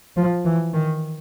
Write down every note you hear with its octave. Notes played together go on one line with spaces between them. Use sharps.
F3
E3
D#3